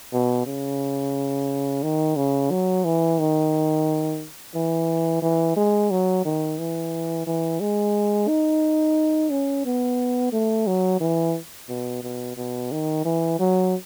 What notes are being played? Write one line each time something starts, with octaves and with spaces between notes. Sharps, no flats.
B2
C#3
D#3
C#3
F#3
E3
D#3
E3
E3
G#3
F#3
D#3
E3
E3
G#3
D#4
C#4
B3
A3
F#3
E3
B2
B2
B2
D#3
E3
F#3